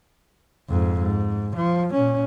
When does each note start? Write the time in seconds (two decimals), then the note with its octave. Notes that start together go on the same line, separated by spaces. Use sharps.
0.70 F2 G#2
1.00 G#2
1.56 F3
1.94 A#2 C#4